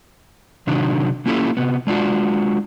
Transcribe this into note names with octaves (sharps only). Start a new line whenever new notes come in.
C3 D#3 F#3 D4
A#3 C#4 E4 F4 G4 A4
C3 B3
G#3 D4 F4 F#4